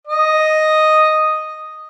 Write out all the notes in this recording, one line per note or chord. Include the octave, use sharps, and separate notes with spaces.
D#5